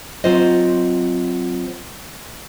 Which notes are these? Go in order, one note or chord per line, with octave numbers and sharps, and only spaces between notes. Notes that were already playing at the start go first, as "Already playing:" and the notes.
F#3 C4 F4 C5 D#5